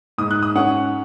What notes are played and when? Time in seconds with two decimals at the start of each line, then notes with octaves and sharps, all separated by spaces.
0.18 G#2 D#6
0.31 F#6
0.43 D#6
0.56 C#4 F#5